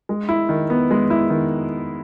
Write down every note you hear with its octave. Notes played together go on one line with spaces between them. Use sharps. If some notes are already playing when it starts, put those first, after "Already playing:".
G#3
E4
D#3
B3
G#3
E4
D#3